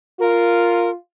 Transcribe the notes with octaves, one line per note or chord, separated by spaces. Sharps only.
F4 A#4